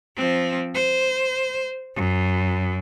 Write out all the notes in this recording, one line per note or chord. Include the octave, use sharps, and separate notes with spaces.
F3 C4
C5
F#2